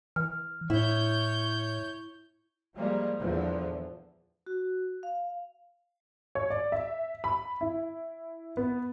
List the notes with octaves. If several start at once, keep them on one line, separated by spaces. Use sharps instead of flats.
E3 F6
A2 E4 C#5 G6
F3 G3 G#3 A#3
E2 A#2 D3 E3 F3
F#4
F5
C#5
D5
E5
B5
E4
B3